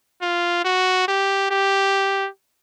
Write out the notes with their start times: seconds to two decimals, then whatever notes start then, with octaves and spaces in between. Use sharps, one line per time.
0.22 F4
0.65 F#4
1.08 G4
1.50 G4